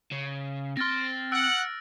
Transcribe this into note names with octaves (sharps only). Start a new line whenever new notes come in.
C#3
C4 C6 F6 A6 A#6
F#5 E6 F#6 D7